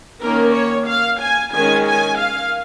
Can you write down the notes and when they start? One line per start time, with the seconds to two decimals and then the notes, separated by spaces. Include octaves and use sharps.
0.19 D#3 A#3 C#4 A#4
0.53 C#5
0.86 F5
1.19 G#5
1.52 D#3 G#3 C#4 G#5
1.86 G#5
2.18 F5